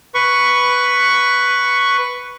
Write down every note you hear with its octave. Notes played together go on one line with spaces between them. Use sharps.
B4 C#6